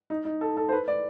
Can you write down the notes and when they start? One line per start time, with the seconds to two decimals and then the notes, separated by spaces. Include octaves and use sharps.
0.10 D#4
0.25 D#4
0.41 A4
0.57 A4
0.68 C5
0.72 B4
0.88 D5